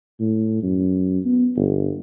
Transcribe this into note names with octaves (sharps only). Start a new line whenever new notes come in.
A2
F#2
B3
G1